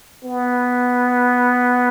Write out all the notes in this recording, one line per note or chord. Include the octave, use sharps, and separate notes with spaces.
B3